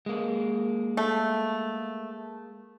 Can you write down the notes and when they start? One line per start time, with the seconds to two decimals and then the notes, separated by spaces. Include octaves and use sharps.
0.06 G#3 A#3
0.97 A3